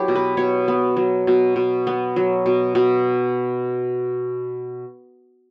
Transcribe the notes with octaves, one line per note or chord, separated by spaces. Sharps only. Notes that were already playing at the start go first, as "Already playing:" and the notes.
Already playing: F#3 B3 E4 G4
B2
B4
B2 C#5
B3
F#3
B2
B2
B3
F#3
B2
B2